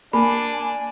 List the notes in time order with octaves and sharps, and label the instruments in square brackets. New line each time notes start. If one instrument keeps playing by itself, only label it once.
[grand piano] A#3 [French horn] D4 [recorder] G#5 [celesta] B5